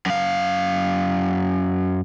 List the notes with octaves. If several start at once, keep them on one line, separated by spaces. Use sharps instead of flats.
F#2 F5